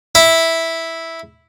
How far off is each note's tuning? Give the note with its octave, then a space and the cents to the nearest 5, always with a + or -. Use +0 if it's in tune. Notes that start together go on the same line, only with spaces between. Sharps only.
E4 -5